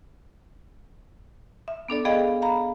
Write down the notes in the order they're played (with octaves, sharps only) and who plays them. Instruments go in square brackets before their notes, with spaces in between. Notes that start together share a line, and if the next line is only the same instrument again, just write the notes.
[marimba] E5
B3 D4 A4 D5
B3 G#4 D#5 F5 G5
F5 A#5 B5